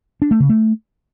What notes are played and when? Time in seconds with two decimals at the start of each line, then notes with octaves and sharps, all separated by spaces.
0.22 D4
0.31 A3
0.40 C#3
0.49 A3